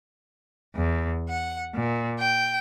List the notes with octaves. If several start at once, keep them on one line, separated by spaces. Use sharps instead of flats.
E2
F#5
A#2
G5